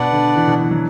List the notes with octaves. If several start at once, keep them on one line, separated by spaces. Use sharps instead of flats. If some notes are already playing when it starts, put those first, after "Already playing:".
Already playing: B2 D4 B4 D5 F#5
D3
E3
B2
E3
F#3